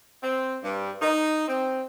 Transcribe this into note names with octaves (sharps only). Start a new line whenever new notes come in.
C4
G2
D#4
C4